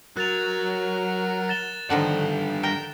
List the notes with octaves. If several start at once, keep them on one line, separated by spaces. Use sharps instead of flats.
F#3 A#4 F#6 A6 F7
A6 E7 G7
G2 D3 D#3 F3 F#5
A#4 G5